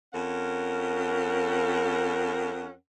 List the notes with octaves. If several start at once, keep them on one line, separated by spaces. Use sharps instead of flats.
F2 C#4 A#4 F#5